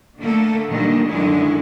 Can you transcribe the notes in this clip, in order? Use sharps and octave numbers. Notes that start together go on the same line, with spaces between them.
D3 A3 A#3 A4
A#2 D3 D#3 F#3 G3 A#3
F#2 D3 D#3 G#3 E4